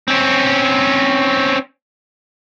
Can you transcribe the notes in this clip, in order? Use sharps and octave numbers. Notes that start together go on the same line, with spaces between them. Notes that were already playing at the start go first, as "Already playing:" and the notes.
C4 C#4